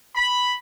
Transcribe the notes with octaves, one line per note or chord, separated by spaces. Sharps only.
B5